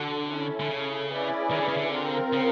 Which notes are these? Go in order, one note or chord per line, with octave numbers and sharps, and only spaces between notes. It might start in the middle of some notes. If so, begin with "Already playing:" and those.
Already playing: D3 D4 F#4 A4
C#4 E4 A4
D3
C#3
C#4 E4 G#4 B4 D5
D#3
D3
C#3
D3
C4 F4 A#4
C#3